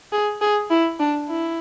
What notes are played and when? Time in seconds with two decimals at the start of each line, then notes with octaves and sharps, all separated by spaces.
0.12 G#4
0.41 G#4
0.70 E4
0.99 D4
1.28 E4